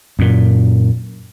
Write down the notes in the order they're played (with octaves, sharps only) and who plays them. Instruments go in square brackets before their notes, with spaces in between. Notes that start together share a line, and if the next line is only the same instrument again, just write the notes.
[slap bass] F#2 A#2